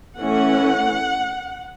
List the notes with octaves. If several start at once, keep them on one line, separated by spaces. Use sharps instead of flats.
E3 A3 C#4 F#5